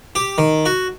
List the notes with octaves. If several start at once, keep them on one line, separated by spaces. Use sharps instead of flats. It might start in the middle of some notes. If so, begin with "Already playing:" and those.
G4
D#3
F#4